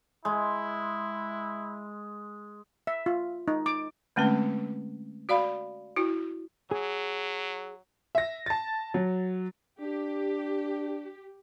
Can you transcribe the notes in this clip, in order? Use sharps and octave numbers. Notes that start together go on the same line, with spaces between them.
G#3 E4
E5
F4
D#4
D6
D3 G#3 A3 C4 C#4 B4
F#4 D5 F5 B5
E4 F#4
F#3 G#4
E5 A#6
A5 A6
F#3
D4 G4